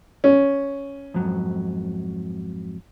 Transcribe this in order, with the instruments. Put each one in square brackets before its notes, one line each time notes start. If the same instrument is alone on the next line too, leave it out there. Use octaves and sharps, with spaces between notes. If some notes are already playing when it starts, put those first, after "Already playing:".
[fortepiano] C#4
[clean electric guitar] F2 G#2 F#3